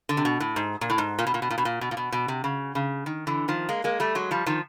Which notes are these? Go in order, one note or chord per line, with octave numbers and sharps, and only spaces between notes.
D3
C3
B2
A2
G#2
A#2
A2
G#2
A#2
B2
A#2
B2
A#2
B2
A#2
B2
A#2
B2
B2
C3
C#3
C#3
D#3
D3 E3
D#3 F3
G#3 A#3
G#3 A#3
G3 A3
F#3 G#3
F3 G3
D#3 F3